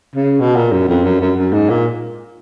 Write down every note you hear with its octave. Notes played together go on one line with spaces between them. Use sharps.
C#3
B2
A#2
F#2
F2
F#2
F#2
F#2
G#2
A#2